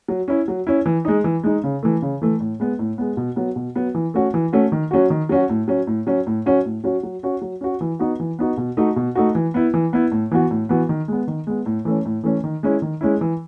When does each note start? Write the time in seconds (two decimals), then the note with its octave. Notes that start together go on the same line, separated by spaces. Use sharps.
0.08 F#3
0.28 C#4 E4
0.48 F#3
0.67 C#4 E4
0.86 E3
1.05 G#3 D#4
1.24 E3
1.44 G#3 D#4
1.64 C#3
1.83 E3 A3
2.02 C#3
2.22 E3 A3
2.40 A2
2.60 G#3 B3
2.79 A2
2.98 G#3 B3
3.17 B2
3.36 F#3 B3
3.56 B2
3.75 F#3 B3
3.95 E3
4.14 A3 C#4 F#4
4.34 E3
4.53 A3 C#4 F#4
4.72 D#3
4.91 F#3 C#4 F#4
5.10 D#3
5.29 F#3 C#4 F#4
5.49 A2
5.68 F#3 C#4
5.87 A2
6.07 F#3 C#4
6.27 A2
6.46 F#3 C#4 F#4
6.65 A2
6.84 F#3 C#4 F#4
7.03 F#3
7.23 C#4 F#4
7.42 F#3
7.61 C#4 F#4
7.81 E3
7.99 B3 D#4 F#4
8.20 E3
8.39 B3 D#4 F#4
8.57 B2
8.77 A3 D#4 F#4
8.96 B2
9.15 A3 D#4 F#4
9.35 E3
9.54 B3 E4
9.74 E3
9.93 B3 E4
10.11 A2
10.31 E3 B3 F#4
10.51 A2
10.69 E3 B3 F#4
10.89 D#3
11.08 G#3 B3
11.28 D#3
11.47 G#3 B3
11.66 A2
11.85 E3 A3 C#4
12.05 A2
12.23 E3 A3 C#4
12.44 D#3
12.63 G#3 C#4 E4
12.82 D#3
13.01 G#3 C#4 E4
13.21 E3